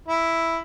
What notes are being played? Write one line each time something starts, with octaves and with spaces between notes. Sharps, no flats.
E4